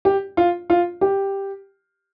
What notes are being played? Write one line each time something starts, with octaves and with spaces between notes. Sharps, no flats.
G4
F4
F4
G4